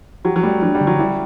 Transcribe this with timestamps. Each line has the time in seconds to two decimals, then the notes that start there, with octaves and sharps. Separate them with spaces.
0.25 F#3 G4
0.36 F#3
0.43 G3 A3
0.62 F#3 D4
0.75 G3
0.81 D3
0.87 F#3
0.99 G3 E4